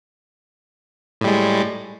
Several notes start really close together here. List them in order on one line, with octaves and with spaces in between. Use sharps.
A2 G3 G#3